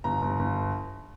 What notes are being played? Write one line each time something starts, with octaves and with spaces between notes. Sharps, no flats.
G1 A#5
G1
G1